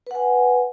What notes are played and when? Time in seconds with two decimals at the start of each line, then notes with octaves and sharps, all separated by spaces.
0.07 B4
0.11 F#5
0.15 G#5